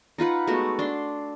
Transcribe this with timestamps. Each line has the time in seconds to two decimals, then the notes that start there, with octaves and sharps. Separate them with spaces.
0.18 D#4 F4 B4 F#5
0.47 G#3 A3 B3 F#4
0.79 D4 D5 C6